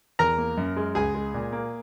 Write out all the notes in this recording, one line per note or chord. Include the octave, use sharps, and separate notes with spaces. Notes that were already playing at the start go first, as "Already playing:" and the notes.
E2 A#4 A#5
A#3
F#2
G#3
C#2 G#4 G#5
G#3
A#2
A#3